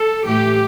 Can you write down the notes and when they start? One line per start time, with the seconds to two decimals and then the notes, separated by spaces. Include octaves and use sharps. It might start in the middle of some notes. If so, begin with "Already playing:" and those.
Already playing: A4
0.26 A2 E3 A3 G4